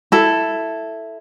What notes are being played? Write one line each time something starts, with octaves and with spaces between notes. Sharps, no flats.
E4 A4